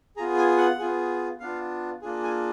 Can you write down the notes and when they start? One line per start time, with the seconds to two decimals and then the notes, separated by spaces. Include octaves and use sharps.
0.16 B3 F4 G#4 A#5
0.37 G#5
0.57 F#5
0.79 B3 F4 G#4
1.40 B3 D4 F4 F5
2.02 A#3 D4 F4 G#4
2.24 G#5